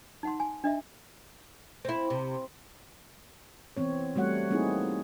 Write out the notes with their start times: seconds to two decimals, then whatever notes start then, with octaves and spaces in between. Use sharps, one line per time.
0.23 D#4 F#5 C6
0.40 G#5
0.64 D4 D#5 E5
1.85 C4 E4
2.10 C3
3.77 E3 B3 C4 C#5
4.15 G3 A3 F#4 C#5 F#5
4.50 A3 A#3 C4 D#4 E4 G#4